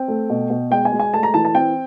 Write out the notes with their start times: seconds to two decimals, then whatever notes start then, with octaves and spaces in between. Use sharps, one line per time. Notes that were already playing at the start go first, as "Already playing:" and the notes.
Already playing: C4 G5
0.08 A3
0.30 B2
0.50 B2
0.71 G#3 G5
0.85 G#5
0.92 G#3
1.00 G#5
1.13 A3 A5
1.23 A#5
1.34 E3 A5
1.45 A5
1.55 C4 G5